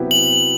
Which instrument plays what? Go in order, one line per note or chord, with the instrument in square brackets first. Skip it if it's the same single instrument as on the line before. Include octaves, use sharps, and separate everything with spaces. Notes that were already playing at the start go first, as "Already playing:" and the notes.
Already playing: [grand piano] C3 F#3 B3 E4 G4
[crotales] F#7